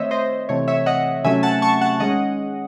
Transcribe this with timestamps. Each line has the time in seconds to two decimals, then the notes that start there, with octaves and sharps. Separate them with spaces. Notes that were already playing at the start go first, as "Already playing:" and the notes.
Already playing: D#3 A3 C4 C5 C#5 D#5 E5
0.11 C5 D#5
0.49 C3 E3 A3 C4 C#5
0.68 C#5 E5
0.86 D#5 F#5
1.24 C3 D#3 F#3 A3 C#4 E5 G#5
1.43 F#5 A5
1.62 A5 C#6
1.81 F#5 A5
2.00 D#3 G#3 C#4 D#5 F#5